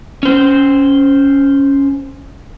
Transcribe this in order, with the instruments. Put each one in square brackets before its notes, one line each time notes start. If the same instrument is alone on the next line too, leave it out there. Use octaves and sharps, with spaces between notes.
[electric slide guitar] C#4 C5